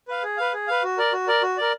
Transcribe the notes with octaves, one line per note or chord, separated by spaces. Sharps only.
B4 F5
G#4
B4 F5
G#4
B4 F5
F#4
A#4 D5
F#4
A#4 D5
F#4
A#4 D5